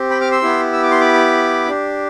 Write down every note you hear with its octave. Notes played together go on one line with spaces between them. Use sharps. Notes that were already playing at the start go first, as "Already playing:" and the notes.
Already playing: C4 G4
G5 B5
D6 F6
C6 E6
B3 E4 G4
E6
D6
C6
B5 D6
D4 G4